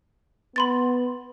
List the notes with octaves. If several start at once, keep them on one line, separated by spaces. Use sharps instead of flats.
B3 B5 C6 A6